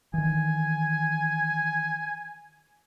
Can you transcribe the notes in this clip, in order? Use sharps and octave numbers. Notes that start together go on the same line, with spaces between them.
D#3 E3 G#5